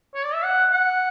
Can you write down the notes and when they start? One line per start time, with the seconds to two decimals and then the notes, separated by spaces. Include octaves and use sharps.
0.14 C#5
0.24 D5
0.34 E5
0.44 F#5
0.71 F#5